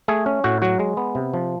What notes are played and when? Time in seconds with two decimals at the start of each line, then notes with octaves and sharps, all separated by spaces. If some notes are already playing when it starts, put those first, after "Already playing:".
0.08 A3 G#4
0.26 C#4
0.44 A2 F#4
0.62 F#3 F#4
0.79 G#3
0.97 B3
1.15 C3
1.34 F3